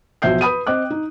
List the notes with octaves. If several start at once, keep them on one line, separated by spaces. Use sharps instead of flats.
B1 B2 F3 E5 G6 C7
B4 B5 D#6 D#7
C4 D#5 D6 F#6
D#4